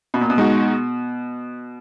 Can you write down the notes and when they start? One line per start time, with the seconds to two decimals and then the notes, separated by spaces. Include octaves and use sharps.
0.14 B2
0.21 A#2
0.30 B2
0.38 G#3 D#4 F#4